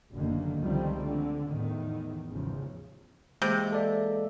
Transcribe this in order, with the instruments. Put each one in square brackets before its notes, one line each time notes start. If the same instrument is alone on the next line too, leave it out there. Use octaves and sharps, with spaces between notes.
[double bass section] F#1 B2 D3 D#3 A#3
C#2 D#3 F3 G3 A3 C4
D3
E2 A2 D#3
A1 E2 G#2 C#3 F3
[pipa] C3 [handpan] E3 G#3 A#3
[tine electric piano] A4 D5 E5